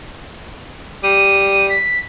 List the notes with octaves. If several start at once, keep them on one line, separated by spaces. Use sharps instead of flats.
G3 D#7
B6